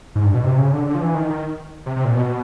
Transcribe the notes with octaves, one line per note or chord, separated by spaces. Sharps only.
G#2
G2
B2
C3
C#3
D3
D3
F3
E3
D#3
D#3
C3
C3
A#2
B2